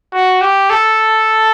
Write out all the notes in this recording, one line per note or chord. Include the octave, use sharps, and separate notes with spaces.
F#4
G4
A4